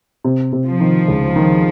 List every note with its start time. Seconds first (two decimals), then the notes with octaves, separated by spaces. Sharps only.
0.24 C3
0.53 C3
0.66 F3
0.80 D#3
1.08 C#2
1.36 D#3